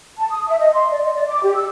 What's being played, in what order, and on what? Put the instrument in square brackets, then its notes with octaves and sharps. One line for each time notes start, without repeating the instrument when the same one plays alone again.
[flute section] A5
D#6
E5
D#5
C6
D5
D#5
D5
D6
G4
E6